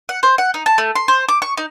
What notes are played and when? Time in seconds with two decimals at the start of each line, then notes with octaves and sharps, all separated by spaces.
0.09 F#5
0.23 C5
0.38 F#5
0.54 D#4
0.66 A5
0.78 A3
0.95 C6
1.08 C5
1.28 D6
1.42 C#6
1.58 D#4